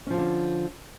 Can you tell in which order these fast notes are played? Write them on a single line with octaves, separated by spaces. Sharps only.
C#4 F3 F4 D3